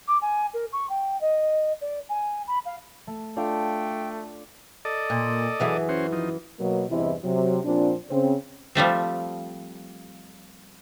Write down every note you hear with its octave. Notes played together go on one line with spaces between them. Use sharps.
D6
G#5
A#4
C#6
G5
D#5
D5
G#5
B5
F5
A3
A3 D4 F4 A4 F5 G5
A4 D5 D#5
A#2
F#2 E3 G#4
C#4 F#4 C5
F3 D#4
B2 F#3 A#3
E2 G2 C3 E3 E4 D#5
C3 F#3
A#2 F3 C4 D4
C#3 C4
F3 G3 A3 C4